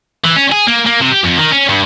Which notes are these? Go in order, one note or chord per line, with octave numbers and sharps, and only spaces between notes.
E3
C#4
G#4
A#3
A#3
C3
G4
F2
D#3
C#4
G2